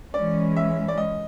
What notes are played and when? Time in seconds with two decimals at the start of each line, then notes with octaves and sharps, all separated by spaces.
0.13 E3 G#3 C#4 D5
0.56 E5
0.88 D5
0.98 D#5